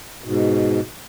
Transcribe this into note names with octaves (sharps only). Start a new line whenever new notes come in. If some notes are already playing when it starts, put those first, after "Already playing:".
G#2 B2